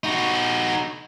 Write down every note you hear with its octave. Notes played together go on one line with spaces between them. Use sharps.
D#4 F#4